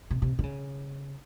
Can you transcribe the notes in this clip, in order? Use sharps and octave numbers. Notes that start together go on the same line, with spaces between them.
C3
C3
D3
C#3